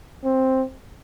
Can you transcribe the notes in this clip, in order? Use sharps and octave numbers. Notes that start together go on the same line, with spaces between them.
C4